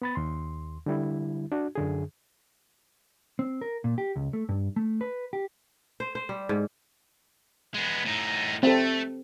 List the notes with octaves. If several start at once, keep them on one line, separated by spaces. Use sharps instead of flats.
B3 B5 A6
D#2 C6
D3 G3 E4
D4 F#4
F#2 D3 G#4
C4
A#4
A#2
G4
C#2
A3
G2
A3
B4
G4
C5
C5
G3
G#2
G#3 B3
A2 D#4
A3 C4 A4